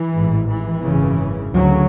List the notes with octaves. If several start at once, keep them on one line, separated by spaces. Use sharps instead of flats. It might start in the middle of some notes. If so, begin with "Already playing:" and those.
Already playing: E3
A1 G#2
E3
G#1 F#2 C#3
D2 C#3 F#3